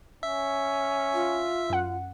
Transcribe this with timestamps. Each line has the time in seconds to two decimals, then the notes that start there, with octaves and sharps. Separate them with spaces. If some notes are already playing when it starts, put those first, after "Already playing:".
0.23 C#4 E5
1.14 F4
1.70 F#2 F#5